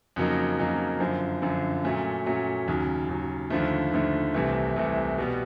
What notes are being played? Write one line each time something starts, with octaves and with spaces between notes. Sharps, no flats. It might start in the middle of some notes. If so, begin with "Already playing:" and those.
F2 C#3 F#3 A#3 D#4
F2 C#3 F#3 A#3 D#4
F#2 D3 F3
F#2 D3 F3
A#2 F#3 A3 C#4
A#2 F#3 A3 C#4
D#2 C#3 F#3
D#2 C#3 F#3
D#2 D3 F3 A3
D#2 D3 F3 A3
C2 C3 E3 A3
C2 C3 E3 A3
B2 G3 B3